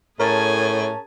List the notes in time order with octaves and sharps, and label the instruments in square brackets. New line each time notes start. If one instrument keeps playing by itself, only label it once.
[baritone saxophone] A2 [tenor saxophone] C#4 [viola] G#4 G#5 [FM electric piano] A#4 A5